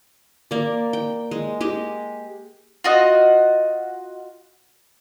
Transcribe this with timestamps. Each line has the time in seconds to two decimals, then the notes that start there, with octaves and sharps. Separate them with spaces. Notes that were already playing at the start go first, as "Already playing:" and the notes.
0.51 A#3 D5
0.93 G5
1.31 G#3
1.61 G#3 G4
2.84 F4 F#4 D#5